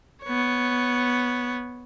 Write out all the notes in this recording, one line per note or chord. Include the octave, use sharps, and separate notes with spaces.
B3 C#5